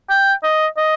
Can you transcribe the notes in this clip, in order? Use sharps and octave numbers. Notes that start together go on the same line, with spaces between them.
G5
D#5
D#5